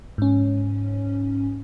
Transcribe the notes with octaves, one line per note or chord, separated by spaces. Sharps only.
G#2 C#4